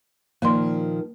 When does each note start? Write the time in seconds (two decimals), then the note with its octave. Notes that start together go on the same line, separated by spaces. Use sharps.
0.42 A#2 D#3 F3 A#3 C6